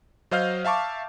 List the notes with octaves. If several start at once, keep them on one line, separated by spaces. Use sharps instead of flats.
F#3 C5 D#5 F5 F6 G6
E5 F5 A5 C#6 D6